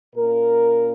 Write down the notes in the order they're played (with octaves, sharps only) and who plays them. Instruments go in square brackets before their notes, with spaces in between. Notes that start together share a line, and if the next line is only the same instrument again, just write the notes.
[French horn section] A#2 A#3 C#4 A#4